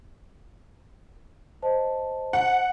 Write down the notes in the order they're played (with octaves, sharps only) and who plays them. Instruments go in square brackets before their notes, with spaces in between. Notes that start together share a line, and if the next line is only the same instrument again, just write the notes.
[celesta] C5 D#5 A5
[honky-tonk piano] F#5